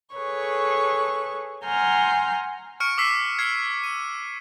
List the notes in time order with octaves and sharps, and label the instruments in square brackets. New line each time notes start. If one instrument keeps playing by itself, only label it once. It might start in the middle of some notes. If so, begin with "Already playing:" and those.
[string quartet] G#4 A4 B4 C#5 C#6
F#5 G#5 A#5 C6 F6 G6
[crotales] C#6 F6 C#7 D7
D6 E6 B6 C7 E7
F6 G#6 C7
D#7